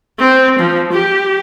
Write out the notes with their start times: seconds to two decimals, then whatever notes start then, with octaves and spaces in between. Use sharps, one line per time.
0.19 C4
0.59 F3
0.92 G4